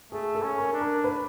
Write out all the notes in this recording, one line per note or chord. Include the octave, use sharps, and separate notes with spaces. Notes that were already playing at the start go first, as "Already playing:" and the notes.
A3 G#4
A4
C#4
A#4
D4
A#4
B4